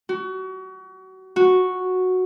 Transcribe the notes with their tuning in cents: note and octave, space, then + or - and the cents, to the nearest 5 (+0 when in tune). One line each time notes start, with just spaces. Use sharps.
F#4 +30
F#4 -5